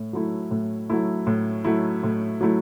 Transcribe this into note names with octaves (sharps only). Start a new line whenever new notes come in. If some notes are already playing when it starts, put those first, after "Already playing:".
Already playing: A2
F#3 A3 E4
A2
F#3 A3 E4
A2
F#3 A3 E4
A2
F#3 A3 E4